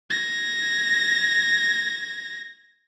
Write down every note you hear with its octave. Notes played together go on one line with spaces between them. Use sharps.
G#6 A#6